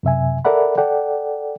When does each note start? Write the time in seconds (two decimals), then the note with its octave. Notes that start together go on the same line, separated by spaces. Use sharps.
0.03 F#2 C3 E5 G#5
0.45 A4 A#4 D5 E5 F#5 B5
0.78 A4 D5 F#5 G5